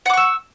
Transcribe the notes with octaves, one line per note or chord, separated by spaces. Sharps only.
F#5 C#6 D6 E6